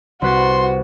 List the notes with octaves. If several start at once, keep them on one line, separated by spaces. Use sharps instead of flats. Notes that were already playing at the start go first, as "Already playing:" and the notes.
C2 F#4 B4 C6 A6